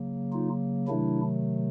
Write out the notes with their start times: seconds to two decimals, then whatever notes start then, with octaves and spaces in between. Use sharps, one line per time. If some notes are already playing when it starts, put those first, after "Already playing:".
Already playing: C#3 F#3 A#3
0.33 D#4 F4
0.88 C3 D#3 F#3 A3 D4 E4